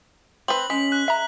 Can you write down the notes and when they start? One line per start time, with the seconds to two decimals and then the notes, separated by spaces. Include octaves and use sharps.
0.48 C4 B4 F#7
0.70 G#3 C#4 B6
0.92 F#6
1.08 E5 A#5